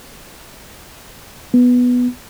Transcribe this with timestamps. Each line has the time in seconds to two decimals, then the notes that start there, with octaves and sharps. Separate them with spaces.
1.54 B3